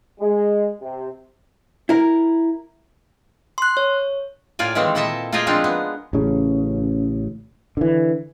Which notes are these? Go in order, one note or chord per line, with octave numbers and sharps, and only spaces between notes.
G#3
C3
E4 A#4
C6 F#6
C#5
A2 A#3 F4 D5 G#5
D#3 E3 G#3 A#3 C4
A#2 E4 A4 D#5 E5 A5
A#3 F4 G#4 D#5 G5 G#5
F3 G#3 C4 D4 D#4 F4
B3
A1 C#3
D3 E3